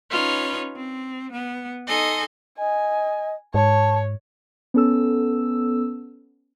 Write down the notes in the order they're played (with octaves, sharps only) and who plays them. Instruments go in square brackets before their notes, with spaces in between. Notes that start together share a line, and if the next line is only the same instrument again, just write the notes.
[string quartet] C#4 D#4 F4 B4 C#5
C4
B3
D#4 A4 D#5 G#5 C6
[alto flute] D#5 [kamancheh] G#5
[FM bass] G#2 [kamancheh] C#5 [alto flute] A5
[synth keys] B3 C#4 A4 E6